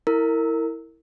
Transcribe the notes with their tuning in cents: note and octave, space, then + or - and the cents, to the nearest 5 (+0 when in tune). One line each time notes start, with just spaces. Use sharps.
E4 -10 A#4 -25